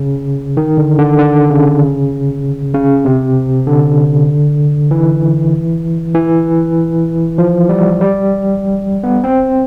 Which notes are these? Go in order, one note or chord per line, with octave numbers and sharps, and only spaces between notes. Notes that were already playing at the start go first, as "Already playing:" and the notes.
Already playing: C#3
D#3
D3
D3
D3
C#3
C#3
C3
D3
E3
E3
F3
G3
G3
B3
C4